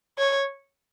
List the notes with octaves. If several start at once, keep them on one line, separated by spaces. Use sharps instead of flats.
C#5